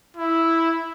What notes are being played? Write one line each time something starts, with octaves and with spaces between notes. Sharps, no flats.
E4